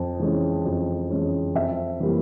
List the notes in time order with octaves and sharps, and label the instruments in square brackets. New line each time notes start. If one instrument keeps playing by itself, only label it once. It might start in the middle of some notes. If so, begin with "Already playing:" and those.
Already playing: [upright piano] F2
E3 G#3 C#4
F2
E3 G#3 C#4
F2 E5
E3 G3 A#3